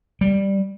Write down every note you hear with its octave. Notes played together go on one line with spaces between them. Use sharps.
G3